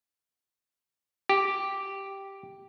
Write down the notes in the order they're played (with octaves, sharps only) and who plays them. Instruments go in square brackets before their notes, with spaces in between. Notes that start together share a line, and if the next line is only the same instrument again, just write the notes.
[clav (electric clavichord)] G4